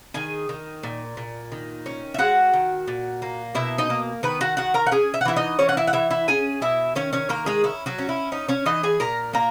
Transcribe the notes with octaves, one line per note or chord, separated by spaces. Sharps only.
D#3 G#4 G#5
D#3
A#2
A#2
D#3
C#4
E5
G#3 F#4 F#5
D#3
A#2
A#3
B2 E4 E5
D#4 D#5
A#3
D#3 B3 B4
F#4 F#5
D#3 F#4 F#5
A#4 A#5
F#5
C#4 G#4 G#5
E5
F#5
E3 E4 E5
D#4 D#5
E3 C#4 C#5
F#5
E4 E5
F#5
E3 E4 E5
E4 E5
C#4 G#4 G#5
B2 E4 E5
D#3 C#4 C#5
C#4 C#5
D#3 A#3 A#4
G#3 G#4
C#4 E4
F#3 F#4
C#4
E4
C#4 D#4
C#4 C#5
E3 D#4 D#5
G#4 G#5
A#2 A#4 A#5
A#3 A#4 A#5